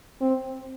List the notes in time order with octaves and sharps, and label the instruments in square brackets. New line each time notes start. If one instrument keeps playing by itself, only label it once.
[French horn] C4